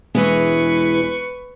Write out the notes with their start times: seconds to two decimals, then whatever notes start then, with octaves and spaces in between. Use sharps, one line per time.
0.15 E1 E3 G#3 B4 C#6